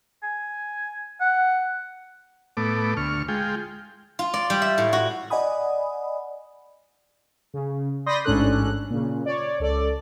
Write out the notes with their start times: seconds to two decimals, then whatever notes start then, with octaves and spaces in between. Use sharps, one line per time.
0.23 G#5
1.20 F#5
2.57 A2 A3 B3 D6
2.97 D2 C#6 F6
3.28 G#3 F4 G5
4.19 F4
4.34 D5
4.50 G3
4.62 E5
4.78 A2
4.93 F#4
5.30 D5 D#5 F#5 G#5 B5 D#6
7.54 C#3
8.06 D5 B5 C6 D#6 G6 A#6
8.25 A1 G#2 C#4 D4 A4 F#6
8.90 A#2 C#3
9.26 C#5 D5
9.60 C#2 A4 D5